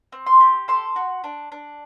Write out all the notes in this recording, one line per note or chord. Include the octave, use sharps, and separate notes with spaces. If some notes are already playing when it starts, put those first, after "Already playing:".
C4
C6
G4
A4 C6
F#4
D4
D4